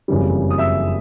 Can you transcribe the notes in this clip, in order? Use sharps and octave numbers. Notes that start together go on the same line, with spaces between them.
F#1 F2 C#3 E3 G3
D#6
E5 E6